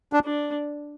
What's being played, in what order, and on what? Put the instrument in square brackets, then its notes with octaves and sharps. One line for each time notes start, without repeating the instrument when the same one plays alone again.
[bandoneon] D4
[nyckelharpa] D4